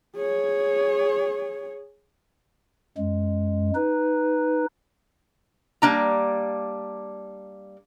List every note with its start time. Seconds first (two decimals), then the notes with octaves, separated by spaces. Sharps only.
0.16 G#4 C#5
2.98 F#2 G#3
3.75 D#4 B4
5.82 G3 A#3 D4 A#5